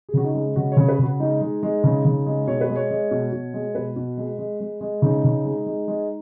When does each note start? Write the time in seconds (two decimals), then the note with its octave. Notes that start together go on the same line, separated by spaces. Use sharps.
0.09 G#4
0.14 C#3 F#4
0.24 D#4
0.35 G#3
0.56 C#3 F#4
0.72 C#3 C#5
0.88 B4
0.99 C#3 F#4
1.20 G#3 D#4
1.41 G#3
1.63 G#3
1.84 C#3
2.05 C#3
2.26 G#3
2.47 B2 C#5
2.61 B4
2.69 G#3
2.76 C#5
2.90 G#3
3.11 B2
3.32 B2
3.54 G#3
3.75 B2 B4
3.96 B2
4.17 G#3
4.39 G#3
4.60 G#3
4.81 G#3
5.02 C#3 D#4
5.24 C#3
5.45 G#3
5.66 G#3
5.88 G#3